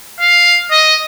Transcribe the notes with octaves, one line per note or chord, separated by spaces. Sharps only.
F5
D#5